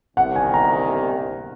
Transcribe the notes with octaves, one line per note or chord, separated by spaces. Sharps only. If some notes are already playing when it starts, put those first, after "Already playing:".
C2 C3 D#3 F#5
G#5
A#5